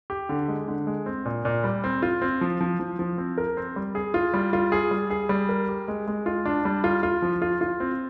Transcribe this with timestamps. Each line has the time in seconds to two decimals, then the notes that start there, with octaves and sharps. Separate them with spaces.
0.10 G4
0.29 D3
0.48 G#3
0.68 D3
0.87 G#3
1.06 C4
1.25 A#2
1.45 A#2
1.64 G3
1.84 C4
2.02 F4
2.22 C4
2.41 F3
2.61 F3
2.80 F3
2.99 F3
3.18 C4
3.38 A#4
3.57 C4
3.76 G3
3.95 G#4
4.14 F4
4.34 G3
4.53 F4
4.72 G#4
4.91 G3
5.10 G#4
5.29 G3
5.49 A#4
5.69 G4
5.88 G#3
6.07 G#3
6.26 F4
6.46 D4
6.65 G3
6.84 F4
7.03 F4
7.22 F3
7.42 F4
7.61 F4
7.80 C4